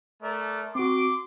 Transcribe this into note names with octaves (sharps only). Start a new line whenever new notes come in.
A3 A#4 D5
C4 F#4 C6 D6